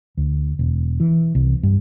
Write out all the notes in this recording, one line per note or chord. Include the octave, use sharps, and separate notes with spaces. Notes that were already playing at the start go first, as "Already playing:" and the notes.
D2
E1
E3
C2
G2